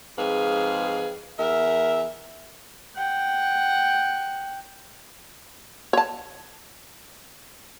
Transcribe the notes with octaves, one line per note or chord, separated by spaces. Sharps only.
F2 G#2 G#4 B4 F5
E2 A#4 E5
F#5 G5
C#5 A5